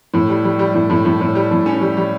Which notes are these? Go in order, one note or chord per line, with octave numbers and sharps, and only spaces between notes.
A2
G3
G3
G3
A2
A2
A2
A2
G3
A2
C#4
G3
G3